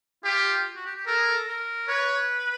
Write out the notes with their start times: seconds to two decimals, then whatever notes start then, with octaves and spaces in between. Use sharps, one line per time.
0.24 F4 G4
0.76 F#4
0.86 G4
0.96 G4
1.06 A4 A#4
1.17 G#4
1.27 A4
1.48 A#4
1.88 B4 C#5